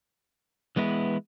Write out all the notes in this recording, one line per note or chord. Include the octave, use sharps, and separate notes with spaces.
E3 G#3 B3 E4